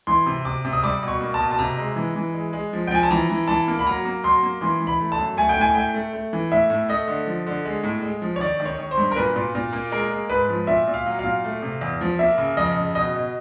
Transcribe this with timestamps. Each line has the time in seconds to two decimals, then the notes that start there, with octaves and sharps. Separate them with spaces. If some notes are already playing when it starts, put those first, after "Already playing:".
0.07 E3 C6
0.26 C3
0.45 C3 D6
0.65 C3
0.73 D#6
0.83 G3 D6
1.03 B2
1.08 C#6
1.21 A#3
1.34 A5
1.40 B2
1.51 A5
1.59 C3 A#5
1.78 G#3
1.96 E3
2.16 E3
2.34 G#3
2.53 G#3
2.73 F3
2.87 G5
2.91 F3 G#5
3.03 A5
3.11 E3 A#5
3.30 E3
3.48 E3 A5
3.68 A#3
3.79 B5
3.87 F#3 A#5
4.05 A#3
4.23 F#3 C6
4.43 A#3
4.61 E3 C6
4.80 E3
4.87 B5
5.00 A3
5.12 A5
5.18 F#2
5.37 A3 G#5
5.49 G5
5.57 A2 G#5
5.75 A3 G5
5.94 A3
6.13 A3
6.33 E3
6.51 A2 E5
6.70 A2
6.89 A3 D#5
7.08 D3
7.27 F3
7.47 D3
7.65 G#3
7.83 A2
8.02 G#3
8.22 F3
8.36 C#5
8.40 D#3 D5
8.60 D#3
8.66 C#5
8.79 D#3
8.91 C5
8.97 G2
9.11 A#4
9.16 A#2 B4
9.36 A#2
9.55 A#2
9.73 A#3
9.92 G#3 A#4
10.11 G#3
10.30 G#2 B4
10.49 F3
10.67 A#2 E5
10.87 A#2
10.94 F5
11.06 F#3
11.19 F5
11.24 A#2
11.44 A3
11.62 C3
11.81 E2
12.01 F3
12.19 A#3 E5
12.38 C#3
12.57 F2 D#5
12.76 C#3
12.95 B2 D#5
13.15 B2